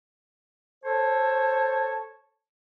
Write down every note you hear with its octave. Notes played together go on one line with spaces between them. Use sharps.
A4 C5 C#5 A5